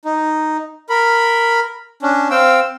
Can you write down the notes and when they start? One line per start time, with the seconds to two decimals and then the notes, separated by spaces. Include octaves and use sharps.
0.05 D#4
0.89 A#4 B5
2.02 C#4 D4
2.31 C4 F5 G5 E6